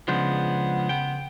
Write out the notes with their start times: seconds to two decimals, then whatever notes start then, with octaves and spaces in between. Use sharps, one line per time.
0.08 C#3 F3 G#3 B3 D4 C6 G6
0.89 B3 G5